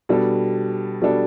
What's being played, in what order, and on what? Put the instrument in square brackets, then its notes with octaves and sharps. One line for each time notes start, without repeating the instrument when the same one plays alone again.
[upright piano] B2 G3 D4 A4
B2 G3 D4 A4